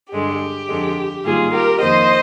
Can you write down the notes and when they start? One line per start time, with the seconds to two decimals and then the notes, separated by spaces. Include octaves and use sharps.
0.13 G2 D3 G#3 G4
0.68 F2 D3 G#3
1.25 G#2 D#3 G3 A#3 F4 G#4
1.52 G4 A#4
1.81 F2 D#3 A#3 C5 D#5